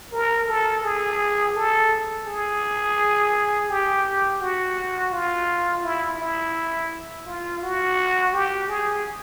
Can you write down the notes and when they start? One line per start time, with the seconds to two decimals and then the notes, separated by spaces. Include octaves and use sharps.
0.12 A#4
0.48 A4
0.84 G#4
1.56 A4
2.27 G#4
3.69 G4
4.41 F#4
5.12 F4
5.84 E4
6.20 E4
7.27 F4
7.62 F#4
8.33 G4
8.69 G#4